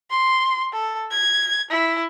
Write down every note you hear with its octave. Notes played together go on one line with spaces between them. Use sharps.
C6
A4
G#6
E4